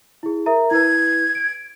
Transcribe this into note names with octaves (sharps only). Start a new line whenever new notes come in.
E4 G#4
A#4 E5 A#5
E4 B4 G#6
D7